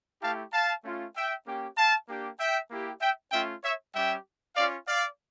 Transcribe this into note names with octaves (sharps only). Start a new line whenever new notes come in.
A3 E4 G4 F5 A5
F5 A5
A3 C#4 F4
E5 G5
A#3 C#4 G4
F5 A5
A#3 D4 G4
E5 G5
A#3 E4 G4
E5 G5
A3 C#4 F4 E5 G5
C#5 E5
G3 C#4 G4 E5 G5
C#4 F4 D5 F5
D5 F5